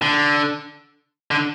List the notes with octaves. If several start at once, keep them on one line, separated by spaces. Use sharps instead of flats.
D3
D3